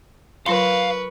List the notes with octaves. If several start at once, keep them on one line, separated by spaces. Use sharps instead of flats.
F#3 F4 A#4 B4 F5 C6 C#6